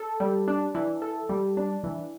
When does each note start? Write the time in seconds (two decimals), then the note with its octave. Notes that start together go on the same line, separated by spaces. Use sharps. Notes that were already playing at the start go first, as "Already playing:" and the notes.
Already playing: A4
0.20 G3
0.48 D4
0.75 E3
1.02 A4
1.29 G3
1.57 D4
1.84 E3